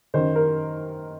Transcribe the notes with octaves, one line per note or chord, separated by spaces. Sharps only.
F#2 D#3 C5
A#4